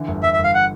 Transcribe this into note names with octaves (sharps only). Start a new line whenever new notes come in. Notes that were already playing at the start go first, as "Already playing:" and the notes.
Already playing: D3 E3
G1
G1 E5
E5
G1
F5
F#5